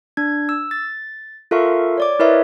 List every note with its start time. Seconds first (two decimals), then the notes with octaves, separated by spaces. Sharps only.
0.17 D4 G#6
0.49 E6
0.71 A6
1.51 F4 A4 A#4 E5 F5 C#6
1.98 C#5 D5 D6
2.19 E4 A#4 B4 C#5 D#5 E5